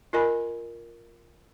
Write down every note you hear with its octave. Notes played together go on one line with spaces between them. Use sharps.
F4 A#4 D#5 G#5 B5